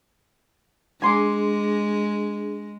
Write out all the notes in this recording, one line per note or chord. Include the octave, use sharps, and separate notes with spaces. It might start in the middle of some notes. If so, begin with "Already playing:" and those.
G#3 D4 G#4 G#5 C6 D6